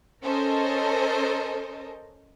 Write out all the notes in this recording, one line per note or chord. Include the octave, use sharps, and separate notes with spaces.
C#4 A4 A#4 C5 D#5